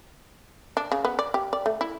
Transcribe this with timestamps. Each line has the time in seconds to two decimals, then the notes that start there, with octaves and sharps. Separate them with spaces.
0.77 D4
0.92 C#3
1.05 B3
1.19 D5
1.34 G4
1.53 D5
1.66 A3
1.81 E4